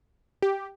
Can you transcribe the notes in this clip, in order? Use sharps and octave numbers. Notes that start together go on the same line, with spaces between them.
G4